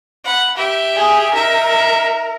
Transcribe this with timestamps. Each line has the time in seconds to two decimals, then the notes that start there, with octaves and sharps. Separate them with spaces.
0.25 F#5 B5
0.56 G4 E5
0.96 G#4
1.34 D#4 A#4 E5